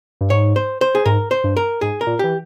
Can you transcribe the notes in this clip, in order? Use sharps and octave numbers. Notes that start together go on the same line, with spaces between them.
G2
G#2 C#5
C5
C5
G#4
G#2 A#4
C5
G2
A#4
G#2 G#4
A#4
A#2
E3 G4